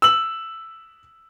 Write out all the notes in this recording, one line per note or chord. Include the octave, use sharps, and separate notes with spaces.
E6 F#7